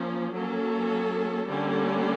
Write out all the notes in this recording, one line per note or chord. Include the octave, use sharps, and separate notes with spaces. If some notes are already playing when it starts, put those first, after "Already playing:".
Already playing: F3 A#3 C#4
F#3 A#3 C#4 A4
D3 G3 A#3 C#4